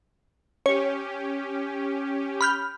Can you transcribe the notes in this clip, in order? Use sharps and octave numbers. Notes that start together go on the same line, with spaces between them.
C#4 G4 C#5
B5 F6 G6